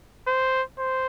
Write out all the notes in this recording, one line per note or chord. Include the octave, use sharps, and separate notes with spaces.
C5
C5